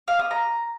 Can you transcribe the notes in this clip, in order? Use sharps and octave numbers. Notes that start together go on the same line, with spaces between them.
F5
D#6
A#5